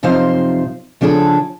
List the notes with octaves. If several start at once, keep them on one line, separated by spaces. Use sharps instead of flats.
F#2 C3 F3 D#4 C5 F5
C#3 F3 D4 G#4 A4